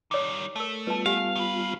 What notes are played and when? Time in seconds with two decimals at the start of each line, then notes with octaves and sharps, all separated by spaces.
0.11 D#3 G3 C#5 D6
0.56 A3 A#4 A5
0.87 G3 B3 F4 B4 A5
1.06 G4 F5 F#5 G#5
1.36 D#3 B4